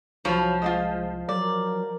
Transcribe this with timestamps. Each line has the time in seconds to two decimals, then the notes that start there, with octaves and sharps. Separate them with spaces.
0.25 C2 F3 F#3 C#5 B5
0.62 G#3 F4 F#4 D#5
1.29 F#3 A#4 D5